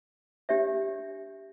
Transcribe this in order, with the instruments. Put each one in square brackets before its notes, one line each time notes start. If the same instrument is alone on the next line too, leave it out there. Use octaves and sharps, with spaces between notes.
[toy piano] D4 G4 C#5 E5